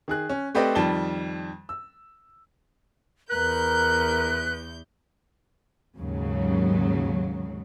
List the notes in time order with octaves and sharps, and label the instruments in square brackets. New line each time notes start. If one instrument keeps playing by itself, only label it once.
[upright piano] D#3 G#4 F#6
C#4
A3 C4 G4 B4 D5 D#5
F2 D#3 G3 A5 E7 G7
E6
[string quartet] E2 G6 [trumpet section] A#4 [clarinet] B4 [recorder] F#6
[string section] D#2 G#2 C#3 F#3